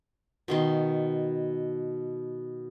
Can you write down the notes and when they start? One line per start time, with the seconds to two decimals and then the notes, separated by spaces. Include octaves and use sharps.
0.48 B2 D#3 C6